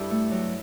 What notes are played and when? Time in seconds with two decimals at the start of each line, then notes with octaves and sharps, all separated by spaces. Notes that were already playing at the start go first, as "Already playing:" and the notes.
Already playing: G2 E4 G4 A4
0.11 A3
0.31 F#3